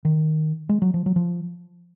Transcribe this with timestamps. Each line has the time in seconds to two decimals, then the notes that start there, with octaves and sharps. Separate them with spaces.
0.05 D#3
0.69 G#3
0.82 F#3
0.94 F3
1.06 F#3
1.16 F3